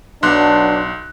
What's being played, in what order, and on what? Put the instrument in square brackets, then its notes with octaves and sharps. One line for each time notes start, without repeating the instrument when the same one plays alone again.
[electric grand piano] B1 C6 F#6 [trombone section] F#3 B3 D4